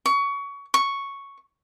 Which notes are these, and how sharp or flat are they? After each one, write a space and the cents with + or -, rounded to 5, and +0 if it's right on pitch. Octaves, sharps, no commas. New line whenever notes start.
C#6 +25
C#6 +0